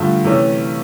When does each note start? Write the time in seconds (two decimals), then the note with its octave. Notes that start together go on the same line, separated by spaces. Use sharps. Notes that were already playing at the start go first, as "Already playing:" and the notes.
Already playing: G2 D3 F3 A3
0.24 C3 E3 A3 C#4